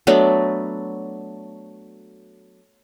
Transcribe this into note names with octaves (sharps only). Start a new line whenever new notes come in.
F#3 A3 B3 D4